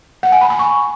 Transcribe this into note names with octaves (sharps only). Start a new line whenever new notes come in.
F#5
G#5
B5
G#5
C#6